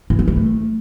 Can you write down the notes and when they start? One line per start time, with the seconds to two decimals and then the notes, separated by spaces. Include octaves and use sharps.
0.10 E3
0.19 C4
0.28 E3
0.36 A3